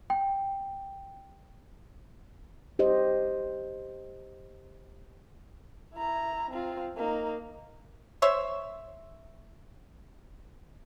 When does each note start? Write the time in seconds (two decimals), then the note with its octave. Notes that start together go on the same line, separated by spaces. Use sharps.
0.10 G5
2.79 G4 C5 D#5
5.95 E4 A#5
6.51 C4 F4
6.97 A#3 D#4
8.22 C5 C#5 E5